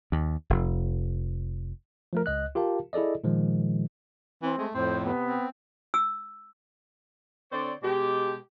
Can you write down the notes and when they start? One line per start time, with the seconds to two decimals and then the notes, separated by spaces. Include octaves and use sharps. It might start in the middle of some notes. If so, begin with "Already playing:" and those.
0.12 D#2
0.50 F1
2.13 F3 A3 A#4
2.26 C#2 D#5 F#6
2.55 F4 G4 A#4 F5 A5
2.93 E4 G#4 A4 D5 D#5
3.24 A#2 D#3 F3 G#3
4.42 E3 C4
4.58 G#3 A3
4.74 F2 A2 C4 C5
5.05 C3 B3
5.27 C4
5.94 E6
7.52 D3 C4 C#5 D5
7.83 B2 G#3 G4